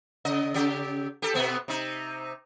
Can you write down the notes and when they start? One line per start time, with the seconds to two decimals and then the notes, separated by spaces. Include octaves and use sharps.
0.25 C#3 D#5
0.54 C#3 G4
1.22 G4 A4
1.34 B2 B3 C4
1.68 C3 D#4